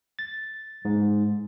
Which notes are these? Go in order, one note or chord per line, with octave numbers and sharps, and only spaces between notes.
A6
G#2